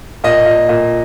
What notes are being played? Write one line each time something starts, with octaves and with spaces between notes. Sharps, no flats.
A#2 D#5
A#2
A#2